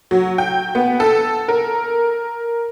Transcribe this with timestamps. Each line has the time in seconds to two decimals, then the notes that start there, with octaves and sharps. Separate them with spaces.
0.11 F#3
0.38 G5
0.75 B3
1.00 A4
1.48 A#4